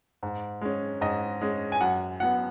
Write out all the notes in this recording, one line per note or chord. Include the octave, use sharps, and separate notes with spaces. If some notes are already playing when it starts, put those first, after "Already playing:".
G#2
G#3 C#4
G#2 D#5
G#3 C#4
G#5
F#2 F#5
F#3 B3 F#5